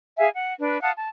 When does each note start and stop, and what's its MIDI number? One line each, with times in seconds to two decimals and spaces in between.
0.18 0.28 68
0.18 0.28 76
0.18 0.28 77
0.18 0.28 80
0.34 0.53 78
0.60 0.80 62
0.60 0.80 71
0.82 0.91 77
0.82 0.91 78
0.82 0.91 81
0.82 0.91 87
0.95 1.07 81